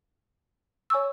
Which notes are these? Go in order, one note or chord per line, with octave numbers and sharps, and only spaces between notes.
C#5 G#5 C#6 E6